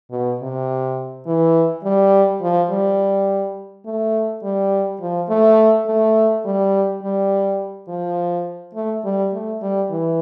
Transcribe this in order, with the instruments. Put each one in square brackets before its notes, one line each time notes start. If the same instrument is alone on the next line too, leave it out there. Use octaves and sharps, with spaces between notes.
[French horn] B2
C3
E3
G3
F3
G3
A3
G3
F3
A3
A3
G3
G3
F3
A3
G3
A3
G3
E3